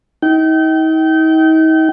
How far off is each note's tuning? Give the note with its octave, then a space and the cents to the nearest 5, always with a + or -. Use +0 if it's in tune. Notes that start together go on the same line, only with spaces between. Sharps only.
D#4 +40 G5 -30